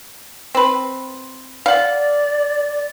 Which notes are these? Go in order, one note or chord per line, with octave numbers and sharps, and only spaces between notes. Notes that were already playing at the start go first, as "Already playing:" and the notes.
C4 B4
D5 F5 F#5